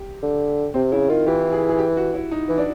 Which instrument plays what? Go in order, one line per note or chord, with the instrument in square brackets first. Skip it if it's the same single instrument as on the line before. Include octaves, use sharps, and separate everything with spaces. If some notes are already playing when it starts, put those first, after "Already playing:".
Already playing: [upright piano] G4
[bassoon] D3
[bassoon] C3 [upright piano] C4
[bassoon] C#3 [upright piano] E4
[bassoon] D#3 [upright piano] F4
[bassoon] E3 [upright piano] G4
[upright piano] G#4
G#4
G4
F#4
E4
D#4
[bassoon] E3
[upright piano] D4